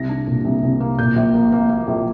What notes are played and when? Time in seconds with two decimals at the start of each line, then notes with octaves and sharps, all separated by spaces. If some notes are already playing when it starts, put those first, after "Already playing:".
Already playing: C2 A#6
0.09 D4
0.27 A#2
0.45 C2
0.63 C2
0.80 A#3
0.99 A#2 G6
1.16 A#1
1.34 A#3
1.52 A#3
1.69 A#3
1.87 A#1